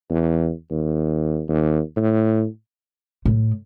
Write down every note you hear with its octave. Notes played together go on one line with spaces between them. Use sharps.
E2
D#2
D#2
A2
A2